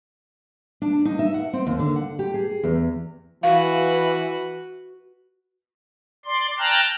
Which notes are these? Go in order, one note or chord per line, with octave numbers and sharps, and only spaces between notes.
D4
D#4
E5
F#5
C4
D#2
D3
F#5
G4
G#4
E2
E3 F#4 B4 F5
D5 C6
G5 A5 A#5 F6 F#6